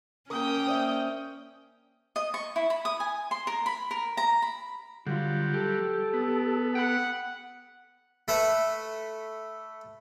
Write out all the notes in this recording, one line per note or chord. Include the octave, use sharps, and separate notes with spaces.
A#3 C#4 A#4 G5 D#6
C5 D5 E5
D#5
C#6
E4
B5
D#6
G#5
C6
A#4
B5
A#4
A#5
B5
D3 F#3 G3 F4
G4 A4
B3
F#5 G5 B5
A3 A4 B4 E5